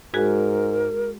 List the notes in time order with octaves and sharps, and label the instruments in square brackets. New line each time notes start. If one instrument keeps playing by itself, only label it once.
[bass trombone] G#2 [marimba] G#3 F#4 G#4 [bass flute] A#4